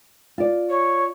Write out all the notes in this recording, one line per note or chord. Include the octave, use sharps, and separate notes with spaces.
F4 D5
C#5